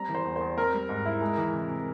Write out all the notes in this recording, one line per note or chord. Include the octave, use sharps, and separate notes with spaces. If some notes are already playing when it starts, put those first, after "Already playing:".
Already playing: G3 C4 A#5
E3
C5
E2
E2 C5
C4 A#4
G3
G#2
E4
G#3
E3
C3
C3